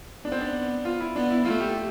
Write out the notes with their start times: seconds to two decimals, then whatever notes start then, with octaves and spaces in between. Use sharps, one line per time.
0.25 B3 D4
0.32 C4
0.41 D4
0.85 F4
1.01 E4
1.16 B3 D4
1.31 E4
1.45 A3 F4
1.61 G4